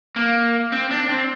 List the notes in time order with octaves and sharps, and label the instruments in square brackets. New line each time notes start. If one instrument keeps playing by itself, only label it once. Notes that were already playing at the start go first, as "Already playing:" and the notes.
[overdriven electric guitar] A#3
C4
D4
C4